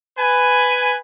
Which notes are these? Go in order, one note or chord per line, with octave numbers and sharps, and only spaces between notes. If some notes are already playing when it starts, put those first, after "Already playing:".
B4 G#5